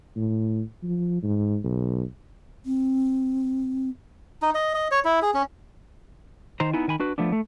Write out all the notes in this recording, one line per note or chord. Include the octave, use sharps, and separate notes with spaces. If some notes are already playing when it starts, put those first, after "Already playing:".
A2
F3
G#2
B1
C4
D#4
D#5
D#5
C#5
E4
G#4
C#4
D#3 C5 A#5
B3 D#4 E4 G#5
D#3 G#5 B5
D4 F#4 B4
F3 A3 B3 D4
A3